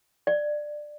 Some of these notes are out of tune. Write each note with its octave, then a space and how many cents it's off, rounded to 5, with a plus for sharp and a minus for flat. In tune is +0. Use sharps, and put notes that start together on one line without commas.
D5 +15